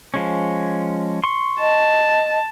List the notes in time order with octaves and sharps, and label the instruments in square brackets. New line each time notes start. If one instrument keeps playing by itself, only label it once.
[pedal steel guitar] F3 G#3 C#4
C6 C#6
[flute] D#5 [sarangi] A5